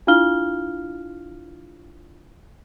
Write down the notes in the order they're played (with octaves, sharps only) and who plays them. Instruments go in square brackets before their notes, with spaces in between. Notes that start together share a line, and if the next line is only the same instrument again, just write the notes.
[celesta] D4 E4 F4 F5 F6 G7